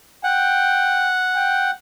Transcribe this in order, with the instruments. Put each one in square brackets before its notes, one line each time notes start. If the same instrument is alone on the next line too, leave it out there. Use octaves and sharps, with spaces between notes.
[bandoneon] F#5 [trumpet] G5
[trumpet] G5